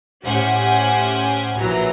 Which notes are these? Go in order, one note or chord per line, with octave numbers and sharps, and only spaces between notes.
A2 C#4 G4 C5 F#5 G#5
A#1 E3 F#3 A#5